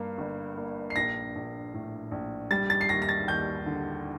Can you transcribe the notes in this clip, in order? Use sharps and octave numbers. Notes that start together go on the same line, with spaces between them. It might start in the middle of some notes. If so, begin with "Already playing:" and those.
Already playing: G2 A#3
G1
A#3
C7
A#1 A#6
A#1
A2
A#1
G3 A6
A6
C7
D#2 A#6
A#6
A6
D#2 G6
D3